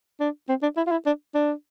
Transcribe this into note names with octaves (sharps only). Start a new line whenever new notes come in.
D4
C4
D4
E4
F4
E4
D4
D4